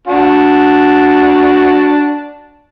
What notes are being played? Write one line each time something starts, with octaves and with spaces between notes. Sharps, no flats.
D4 F#4